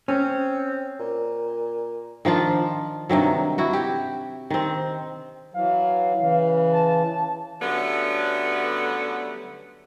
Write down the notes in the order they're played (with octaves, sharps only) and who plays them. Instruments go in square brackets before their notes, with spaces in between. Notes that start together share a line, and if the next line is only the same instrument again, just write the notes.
[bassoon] C4 [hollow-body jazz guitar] C#4
[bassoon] A#2
[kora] D#3 F3 D4 F4
G2 C3 D#3 F#3
E4 F#4
G4
D#3 C4
[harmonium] E3 F#3 [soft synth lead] F5
[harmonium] C#3 E3
[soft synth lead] A5
[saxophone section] D3 F#3 G3 A3 B3 C#4